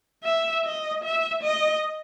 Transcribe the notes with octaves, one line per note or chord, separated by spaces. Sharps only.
E5
D#5
E5
D#5